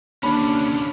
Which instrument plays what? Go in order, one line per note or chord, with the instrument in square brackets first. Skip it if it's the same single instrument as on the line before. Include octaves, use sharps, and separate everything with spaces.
[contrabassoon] D#2 [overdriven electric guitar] D3 C#4 [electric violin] D4 [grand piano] B5